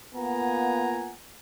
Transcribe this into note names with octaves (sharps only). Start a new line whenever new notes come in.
A#3 B3 F4 F#5 G#5 A#5